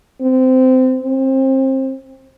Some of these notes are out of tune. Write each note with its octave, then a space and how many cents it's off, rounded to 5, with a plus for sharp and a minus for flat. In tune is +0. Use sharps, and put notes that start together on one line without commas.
C4 -20
C4 +25